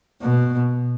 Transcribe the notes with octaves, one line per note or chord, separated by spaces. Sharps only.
B2